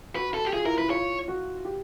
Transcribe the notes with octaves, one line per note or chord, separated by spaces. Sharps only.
F#4 B4
A4
G4
F4 G#4
E4 A#4
E4 B4
F4 C#5
F#4
G4